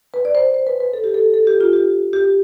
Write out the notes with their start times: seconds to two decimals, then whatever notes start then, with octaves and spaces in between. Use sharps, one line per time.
0.14 B4
0.25 D5
0.35 C5
0.54 C5
0.67 B4
0.80 B4
0.93 A4
1.04 G4
1.14 A4
1.34 A4
1.47 G4
1.61 F4
1.73 G4
2.13 G4